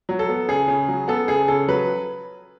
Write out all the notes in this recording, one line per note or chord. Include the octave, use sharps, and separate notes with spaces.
F#3
A4
B3
C#3 G#4
C#3
F#3
B3 A4
C#3 G#4
C#3 A4
F#3 B4